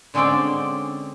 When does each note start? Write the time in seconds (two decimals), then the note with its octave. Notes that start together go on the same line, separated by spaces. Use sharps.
0.14 D3 G#3 C4 C#4 D5 G5